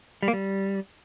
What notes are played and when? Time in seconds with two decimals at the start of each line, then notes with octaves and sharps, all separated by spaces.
0.23 G3
0.28 A#3
0.33 G3